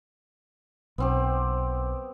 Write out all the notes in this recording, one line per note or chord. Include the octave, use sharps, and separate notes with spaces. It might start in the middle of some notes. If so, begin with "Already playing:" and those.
B1 B3 C4 G4